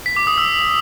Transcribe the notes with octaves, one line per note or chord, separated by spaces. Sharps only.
B6
D6
D#6
E6